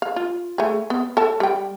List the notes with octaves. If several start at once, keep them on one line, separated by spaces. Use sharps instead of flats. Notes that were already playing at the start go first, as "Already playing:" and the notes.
F5
F4
A3 G#4
B3
A4 A5
G3 G5